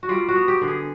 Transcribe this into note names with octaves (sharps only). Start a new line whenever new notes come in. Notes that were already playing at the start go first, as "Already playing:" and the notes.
F#4
G3 F4
F#4
B3
G4
D3
G#4